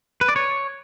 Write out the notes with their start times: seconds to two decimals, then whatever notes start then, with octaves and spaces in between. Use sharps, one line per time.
0.21 B4
0.29 D5
0.36 C#5